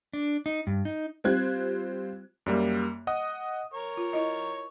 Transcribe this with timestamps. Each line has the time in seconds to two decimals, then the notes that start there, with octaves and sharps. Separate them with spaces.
0.13 D4
0.46 D#4
0.67 G2
0.85 D#4
1.24 G3 C4 F4 C5 F#6 G#6
2.46 F#2 G3 A#3
3.07 D#5 F#5 D#6
3.74 A#4 C#5 C#6
3.97 F4
4.13 E4 D#5